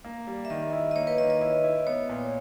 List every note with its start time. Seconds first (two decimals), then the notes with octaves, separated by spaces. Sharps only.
0.05 A#3
0.27 G3
0.45 E5
0.50 D#3 D#5
0.73 E4
0.91 D#5
0.95 A#3 C#5
1.07 B4
1.18 D#3 D#5
1.30 D#5
1.41 E4 D#5
1.64 E4
1.87 B3 C#5
2.09 A#2